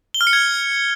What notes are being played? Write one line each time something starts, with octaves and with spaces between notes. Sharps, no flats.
G7
F6
C#7
G#6